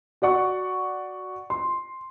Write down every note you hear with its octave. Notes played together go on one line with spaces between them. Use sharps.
F#4 D5 F#5 C#6
C6